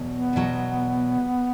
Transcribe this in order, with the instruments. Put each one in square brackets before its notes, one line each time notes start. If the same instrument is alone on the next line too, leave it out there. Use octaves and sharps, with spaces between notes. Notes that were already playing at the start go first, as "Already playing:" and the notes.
Already playing: [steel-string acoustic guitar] E2 B2 F#3
[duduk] B3
[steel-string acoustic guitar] E2 B2 F#3